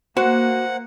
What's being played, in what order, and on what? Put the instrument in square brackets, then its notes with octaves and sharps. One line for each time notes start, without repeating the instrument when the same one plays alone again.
[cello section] A#3 [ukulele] F#4 [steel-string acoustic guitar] C5 [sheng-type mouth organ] F#5